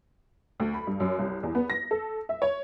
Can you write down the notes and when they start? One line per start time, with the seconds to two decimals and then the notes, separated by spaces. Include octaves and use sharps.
0.60 D2
0.74 B5
0.87 G2
1.00 F#2
1.19 C2
1.43 E2
1.55 B3
1.70 A#6
1.91 A4
2.29 E5
2.42 C#5